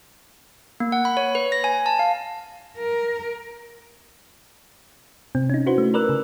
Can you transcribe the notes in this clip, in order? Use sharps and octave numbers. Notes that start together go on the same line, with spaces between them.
A#3
F#5
B5
C#5
B4
A#6
G#5
A5
F5
A#4
C3 C4
C#4 D#4
E4 F#4 B4 C5
A3
A#4 B4 D5 E6 F#6
C#3